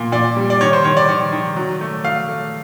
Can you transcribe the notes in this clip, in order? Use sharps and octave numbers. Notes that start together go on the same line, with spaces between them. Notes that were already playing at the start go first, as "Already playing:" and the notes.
Already playing: A#2 A#3
A#2 D5
G3
D5
D#3 C#5
C5
D#3 C#5
D5
D#3
D#3
F#3
A3
A3 F5
A3